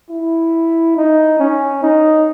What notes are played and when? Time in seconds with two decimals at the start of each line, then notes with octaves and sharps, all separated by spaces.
0.10 E4
0.97 D#4
1.39 C#4
1.83 D#4